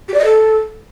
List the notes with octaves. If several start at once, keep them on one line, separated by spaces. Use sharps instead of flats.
G4
D5
D#5
A4